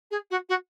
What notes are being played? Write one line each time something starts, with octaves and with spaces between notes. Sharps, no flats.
G#4
F#4
F#4